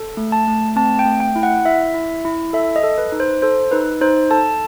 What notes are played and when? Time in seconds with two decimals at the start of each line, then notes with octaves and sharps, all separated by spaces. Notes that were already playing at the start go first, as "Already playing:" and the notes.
Already playing: A4
0.17 A3
0.32 A5
0.48 A3
0.76 C4 A5
0.99 G5
1.06 A3
1.20 G5
1.36 E4
1.43 F#5
1.65 E4 E5
1.94 E4
2.25 E4
2.53 A4 E5
2.76 D#5
2.83 A4
2.98 B4
3.12 D#4
3.20 C5
3.42 A4 C5
3.71 D#4 B4
4.01 D#4 C5
4.31 A4 A5